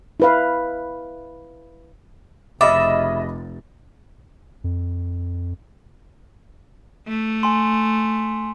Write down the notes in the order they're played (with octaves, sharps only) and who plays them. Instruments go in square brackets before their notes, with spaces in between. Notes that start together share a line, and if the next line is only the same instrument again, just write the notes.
[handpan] E4 B4 F5
[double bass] F1 [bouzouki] C#3 E5 [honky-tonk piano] D#5 B5 A6 [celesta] D6
[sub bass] F2
[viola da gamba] A3
[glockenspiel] G#5 C6